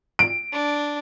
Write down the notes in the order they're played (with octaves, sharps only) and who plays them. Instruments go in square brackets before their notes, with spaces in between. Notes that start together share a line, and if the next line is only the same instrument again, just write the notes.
[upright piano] D7
[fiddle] D4